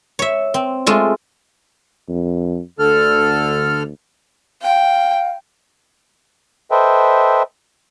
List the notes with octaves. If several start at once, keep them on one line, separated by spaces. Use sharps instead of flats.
C#5 E5
C4
G#3 A3 F4
F2
D2 D3 A4 F6
F5 G5
A4 B4 C5 D#5 E5 G5